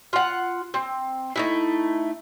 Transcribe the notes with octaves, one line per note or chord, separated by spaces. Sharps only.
F4 F#5
C4
A3 D#4 E4